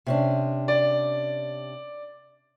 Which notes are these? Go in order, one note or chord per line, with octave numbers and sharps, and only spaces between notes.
C3 C#4 D4
D5